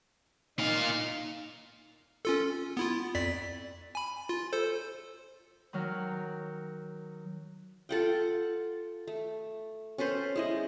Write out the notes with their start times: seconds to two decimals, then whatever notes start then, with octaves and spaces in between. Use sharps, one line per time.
0.59 A#2 D#4 F5
2.25 C#4 F4 A4
2.77 B3 E4 F4
3.15 F2 D5 B6
3.95 G#5 B5
4.29 F4
4.53 A4 C5
5.73 D#3 F#3 F6
7.89 F4 A4 F#5 G5
9.08 A3
9.98 C#4 A4 B4 C5
10.36 G#3 E4 D#5